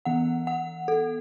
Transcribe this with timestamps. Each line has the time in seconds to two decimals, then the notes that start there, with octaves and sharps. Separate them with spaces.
0.05 E3 B3 F#5
0.47 F#5
0.88 A4